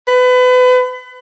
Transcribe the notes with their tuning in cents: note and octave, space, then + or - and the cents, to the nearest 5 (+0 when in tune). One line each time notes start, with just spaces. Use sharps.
B4 +30